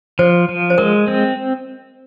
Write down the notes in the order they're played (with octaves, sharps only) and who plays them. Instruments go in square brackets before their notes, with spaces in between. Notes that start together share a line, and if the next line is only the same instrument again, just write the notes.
[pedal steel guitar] F3 [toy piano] C5
[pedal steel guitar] F3
[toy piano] C5
[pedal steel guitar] G#3 [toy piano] A#4
[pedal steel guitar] C4